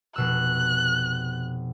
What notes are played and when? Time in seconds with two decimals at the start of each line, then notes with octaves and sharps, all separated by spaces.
0.16 F1 B2 E6 F#6